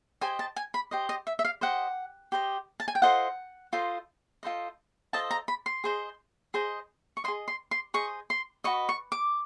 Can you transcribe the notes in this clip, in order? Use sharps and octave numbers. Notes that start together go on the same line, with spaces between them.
G4 C5 D#5 G#5
A5
G#5
B5
G4 C5 D#5
D#5
E5
E5
F5
G4 C5 D#5 F#5
G4 C5 D#5
A5
G#5
G5
F4 A4 C5 D#5 F#5
F4 A4 C5 D#5
F4 A4 C5 D#5
F4 A4 C5 D#5 A5
A#5
B5
C6
G#4 C5 D#5
G#4 C5 D#5
C#6
G#4 C5 D#5 C6
C6
C6
G#4 C5 D#5 C#6
C6
F#4 B4 D#5 C#6
C#6
D6